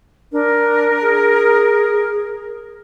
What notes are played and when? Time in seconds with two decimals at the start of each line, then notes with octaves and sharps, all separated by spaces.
0.32 D4 A#4
1.02 G#4